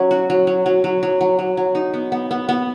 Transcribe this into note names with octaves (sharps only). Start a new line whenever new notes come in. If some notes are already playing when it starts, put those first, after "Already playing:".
Already playing: F#3 C#4
F#4
F#3
F#3
F#3
F#3
F#3
F#3
F#3
F#3
D#4
B3
B3
B3
B3